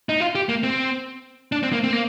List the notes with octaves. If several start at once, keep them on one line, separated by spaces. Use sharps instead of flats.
D#4
F4
G4
A#3
C4
D4
C4
A#3
C4
A#3